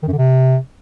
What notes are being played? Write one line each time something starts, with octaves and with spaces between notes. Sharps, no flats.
D#3
F#2
D3
C3